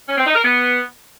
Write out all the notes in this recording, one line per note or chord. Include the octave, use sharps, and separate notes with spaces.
C#4
C4
D#4
A#4
B3